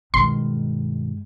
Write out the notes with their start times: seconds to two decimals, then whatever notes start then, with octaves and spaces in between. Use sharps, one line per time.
0.14 G2 B2 D#3 G#3 C6